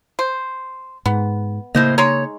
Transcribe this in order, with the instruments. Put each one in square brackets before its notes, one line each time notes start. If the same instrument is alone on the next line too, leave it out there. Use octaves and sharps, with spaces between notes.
[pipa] C5
[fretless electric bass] G#2 [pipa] B3
[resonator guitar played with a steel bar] A2 C5 D#5 [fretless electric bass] C#3 A#3
[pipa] G#3 D#4 [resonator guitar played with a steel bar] C#5